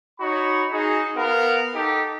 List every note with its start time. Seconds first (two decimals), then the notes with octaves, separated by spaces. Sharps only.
0.20 D#4 F#4 C#5 B5
0.71 D#4 F#4 G#4
1.15 B3 A#4 F5 F#5
1.75 D#4 G4 A4